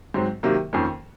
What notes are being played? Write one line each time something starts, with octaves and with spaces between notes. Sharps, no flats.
G#2 F#3 C4
C3 D#3 F#3 A#3
F2 D#3 A#3 C#4